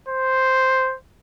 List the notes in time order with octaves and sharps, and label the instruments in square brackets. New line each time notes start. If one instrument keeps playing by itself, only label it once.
[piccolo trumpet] C5